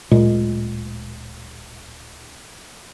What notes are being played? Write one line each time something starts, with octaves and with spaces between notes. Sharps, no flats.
D1 A#2 G#3